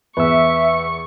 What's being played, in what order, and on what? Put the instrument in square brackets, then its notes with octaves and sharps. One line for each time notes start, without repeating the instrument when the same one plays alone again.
[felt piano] E2 [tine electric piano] B4 E6 [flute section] E5 [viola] C#6